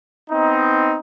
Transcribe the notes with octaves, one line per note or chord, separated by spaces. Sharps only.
B3 C4 D#4